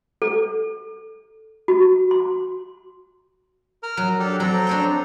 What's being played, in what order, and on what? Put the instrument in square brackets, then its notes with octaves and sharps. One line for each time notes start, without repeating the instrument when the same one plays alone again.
[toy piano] A4
F#4
C6
[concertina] A#4 F6
[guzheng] F#3
[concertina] D4 G4 A4
[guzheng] F#3 [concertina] C4 A4 A#5
[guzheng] D4 C#5 G5